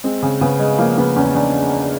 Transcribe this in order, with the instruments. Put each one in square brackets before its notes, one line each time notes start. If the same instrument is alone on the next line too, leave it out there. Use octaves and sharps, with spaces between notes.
[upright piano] G#3 [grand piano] C4
[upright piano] C#3
[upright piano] C#3 [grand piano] B3
[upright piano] G#3
[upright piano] F3 [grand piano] A#3
[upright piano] C#3 [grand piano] B3
[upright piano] E2 [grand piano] C#4
[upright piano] E2 [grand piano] D4